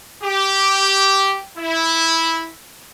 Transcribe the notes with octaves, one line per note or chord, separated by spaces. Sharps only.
G4
E4